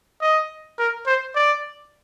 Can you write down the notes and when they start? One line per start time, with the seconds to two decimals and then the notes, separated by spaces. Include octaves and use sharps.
0.22 D#5
0.79 A#4
1.07 C5
1.35 D5